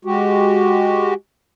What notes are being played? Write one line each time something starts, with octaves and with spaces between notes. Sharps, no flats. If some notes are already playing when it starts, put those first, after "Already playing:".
G#3 F#4 G4